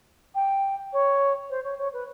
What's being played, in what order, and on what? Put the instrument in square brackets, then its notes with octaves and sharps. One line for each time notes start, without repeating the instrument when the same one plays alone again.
[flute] G5
C#5
C5
C#5
C#5
B4